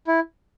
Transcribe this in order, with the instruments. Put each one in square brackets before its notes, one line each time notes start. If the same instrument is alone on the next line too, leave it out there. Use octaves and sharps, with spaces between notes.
[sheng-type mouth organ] E4